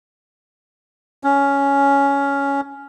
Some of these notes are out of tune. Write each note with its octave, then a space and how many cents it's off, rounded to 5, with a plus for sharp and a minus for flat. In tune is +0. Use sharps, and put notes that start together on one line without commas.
C#4 +10